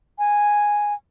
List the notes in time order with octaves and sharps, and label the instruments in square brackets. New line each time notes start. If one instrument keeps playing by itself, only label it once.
[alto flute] G#5